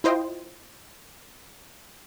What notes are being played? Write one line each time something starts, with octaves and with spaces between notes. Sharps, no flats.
E4 F4 C5 D#5 G5